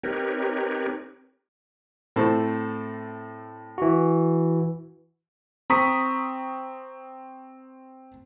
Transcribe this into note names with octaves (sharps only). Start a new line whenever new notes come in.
C4 D#4 G4 A#4 B4 C#5
A2 C4 A4
E3 F#4
C4 A#5 C#6 D#6 B6